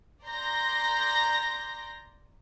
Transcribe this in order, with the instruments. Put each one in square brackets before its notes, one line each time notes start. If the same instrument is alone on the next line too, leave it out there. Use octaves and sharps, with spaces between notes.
[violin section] D5 A#5 C6 G6 A#6